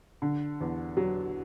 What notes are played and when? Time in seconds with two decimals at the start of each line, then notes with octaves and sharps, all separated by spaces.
0.22 D3
0.61 E2
0.97 F#3